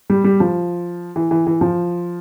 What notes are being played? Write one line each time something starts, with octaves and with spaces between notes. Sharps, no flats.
G3
G3
F3
E3
E3
E3
F3